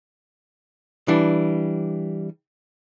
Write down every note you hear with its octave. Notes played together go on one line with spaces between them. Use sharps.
E3 G3 D4